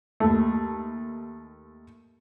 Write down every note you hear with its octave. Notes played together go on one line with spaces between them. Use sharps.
D#2 A3